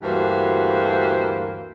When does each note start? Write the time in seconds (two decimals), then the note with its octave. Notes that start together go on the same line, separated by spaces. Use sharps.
0.03 D2 G2 E3 A#3 F#4 C5